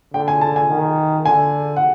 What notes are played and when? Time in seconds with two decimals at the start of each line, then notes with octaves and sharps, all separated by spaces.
0.14 D3 G5
0.28 G#5
0.41 A5
0.56 G#5
0.70 D#3
1.25 D3 G#5
1.76 F#5